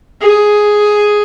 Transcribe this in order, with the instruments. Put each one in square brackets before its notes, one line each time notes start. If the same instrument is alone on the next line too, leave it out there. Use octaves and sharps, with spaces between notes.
[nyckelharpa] G#4